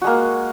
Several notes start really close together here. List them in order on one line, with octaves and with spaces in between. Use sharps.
F#4 G#3 A#3